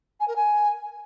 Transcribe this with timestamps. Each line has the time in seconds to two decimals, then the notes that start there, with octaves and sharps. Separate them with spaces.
0.20 G#5
0.28 A#4
0.35 G#5